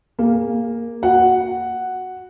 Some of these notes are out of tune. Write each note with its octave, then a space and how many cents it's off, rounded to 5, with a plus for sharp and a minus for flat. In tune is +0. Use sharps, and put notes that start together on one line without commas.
A#3 +0 G#4 -20
F#4 -5 F#5 +0